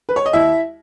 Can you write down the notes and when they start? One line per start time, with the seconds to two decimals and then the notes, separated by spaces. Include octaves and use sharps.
0.09 B4
0.16 C#5
0.26 D#5
0.33 D#2 E4 E5